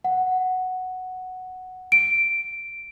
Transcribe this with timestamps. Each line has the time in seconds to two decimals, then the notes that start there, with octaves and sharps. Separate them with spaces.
0.04 F#5
1.92 D7